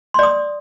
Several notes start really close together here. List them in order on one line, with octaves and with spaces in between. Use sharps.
C6 D5 D#6